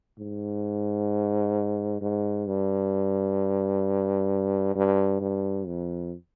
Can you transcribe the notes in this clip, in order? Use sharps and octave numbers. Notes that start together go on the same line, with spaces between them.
G#2
G#2
G2
G2
G2
F2